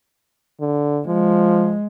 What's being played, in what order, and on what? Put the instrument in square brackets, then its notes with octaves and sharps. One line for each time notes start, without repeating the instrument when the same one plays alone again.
[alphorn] D3
[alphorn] F3 [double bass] G#3